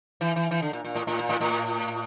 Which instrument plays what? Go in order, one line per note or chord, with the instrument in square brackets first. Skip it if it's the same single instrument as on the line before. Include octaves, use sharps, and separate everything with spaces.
[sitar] E3
E3
E3
D3
A#2
A#2
A2
A2
A#2
A2
A2